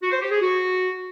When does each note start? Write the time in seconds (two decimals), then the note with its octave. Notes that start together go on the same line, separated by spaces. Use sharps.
0.02 F#4
0.11 C5
0.21 G4
0.30 G#4
0.40 F#4